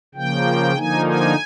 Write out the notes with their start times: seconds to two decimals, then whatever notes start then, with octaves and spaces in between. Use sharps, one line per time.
0.15 C#3 F3 A#3 G5
0.75 D3 F3 A#3 D#4 G#5
1.06 G#5